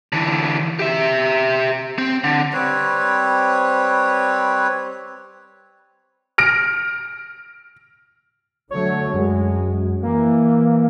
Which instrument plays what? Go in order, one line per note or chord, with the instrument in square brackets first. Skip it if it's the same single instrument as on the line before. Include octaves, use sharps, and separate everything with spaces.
[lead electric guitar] D3 E3
G4 E5
C4
D3
[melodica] G3 C4 B4 C#5
[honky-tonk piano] F6 A#6 D7
[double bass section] D3 F#3 A3 [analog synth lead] C#5
[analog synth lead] F#2 [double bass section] G#3
[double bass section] E3 [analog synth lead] A#3